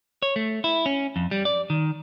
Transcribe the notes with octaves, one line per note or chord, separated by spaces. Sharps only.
C#5
A3
E4
C#4
F2
G3
D5
D#3